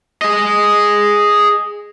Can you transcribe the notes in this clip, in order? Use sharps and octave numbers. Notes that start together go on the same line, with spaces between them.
G#4 D#5